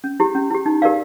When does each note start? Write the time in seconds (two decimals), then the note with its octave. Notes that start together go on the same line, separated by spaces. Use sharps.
0.04 C#4
0.20 E4 G4
0.35 C#4
0.50 E4 G4
0.66 D#4
0.82 G4 A#4 D5 F5